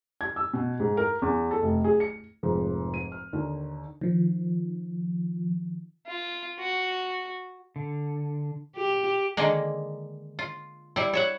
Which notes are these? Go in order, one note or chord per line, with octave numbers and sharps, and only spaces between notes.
G#6
E6
B2
G#2
A#4
E2
A4
F1
G#4
C#7
F1 G#2 F3
D#7
F6
D#2 D3 D#3
D#3 F3
F4
F#4
D3
G4
D3 D#3 G#3 A#3
F4
G3 E4
C#5 E5 F#5